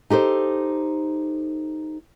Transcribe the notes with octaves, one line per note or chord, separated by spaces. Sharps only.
D#4 G4 A4 C5